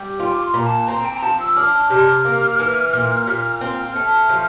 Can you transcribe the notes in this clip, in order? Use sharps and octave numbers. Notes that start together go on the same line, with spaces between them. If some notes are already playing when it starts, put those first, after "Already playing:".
Already playing: G3
F4 G5
D6
C6
A#2 A#5
A5
C4 A#5
G5
A#5
F3 A5
E6
D4 F6
C3 F6
A#3
E3
A#2
A#2
C4 F6
A3
F3